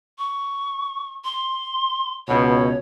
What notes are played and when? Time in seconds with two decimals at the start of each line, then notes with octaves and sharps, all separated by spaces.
0.19 C#6
1.24 C6
2.28 C#2 B2 C#5